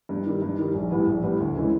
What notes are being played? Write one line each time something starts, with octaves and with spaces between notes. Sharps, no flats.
G2
D#3 G3
G2
D#3 G3
A#1
A2 E3 G3 B3
A#1
A2 E3 G3 B3
D2
C#3 E3 G#3